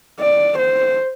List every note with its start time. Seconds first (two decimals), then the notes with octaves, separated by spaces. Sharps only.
0.20 D5
0.58 C5